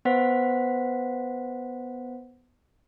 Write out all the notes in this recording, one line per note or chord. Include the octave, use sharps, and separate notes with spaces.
B3 B4 C5 F#5 B6